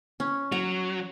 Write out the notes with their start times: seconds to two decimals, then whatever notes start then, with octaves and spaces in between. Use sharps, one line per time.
0.20 C#4
0.52 F#3 A#5